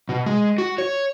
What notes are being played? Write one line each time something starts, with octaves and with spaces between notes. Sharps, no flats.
B2
G#3
F#4
C#5